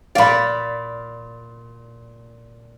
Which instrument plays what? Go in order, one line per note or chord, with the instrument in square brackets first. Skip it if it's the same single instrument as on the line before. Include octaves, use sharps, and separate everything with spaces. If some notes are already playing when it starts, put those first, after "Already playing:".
[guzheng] A#2 D5 [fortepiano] F5 B5